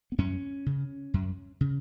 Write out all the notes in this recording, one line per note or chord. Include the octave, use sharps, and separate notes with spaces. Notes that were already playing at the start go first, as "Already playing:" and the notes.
B3
F#2 C#4
C#3
F#2
C#3